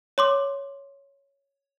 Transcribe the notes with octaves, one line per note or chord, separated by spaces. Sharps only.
C#5 C6 D6